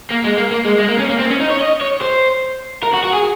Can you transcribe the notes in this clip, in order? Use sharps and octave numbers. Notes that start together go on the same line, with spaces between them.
A#3
G#3
A#3
A#3
G#3
G#3
A#3
C#4
A#3
C4
C#4
D#4
C#5
D#5
C#5
C5
A#4
F#4
F#4
G#4